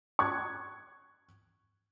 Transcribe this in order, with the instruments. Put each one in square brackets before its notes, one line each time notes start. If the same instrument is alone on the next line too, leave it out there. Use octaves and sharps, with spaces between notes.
[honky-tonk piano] C#6 F#6 G#6